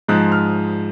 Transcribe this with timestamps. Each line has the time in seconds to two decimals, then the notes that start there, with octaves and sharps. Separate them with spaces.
0.08 G#2 F3 G#3 F#6
0.32 F6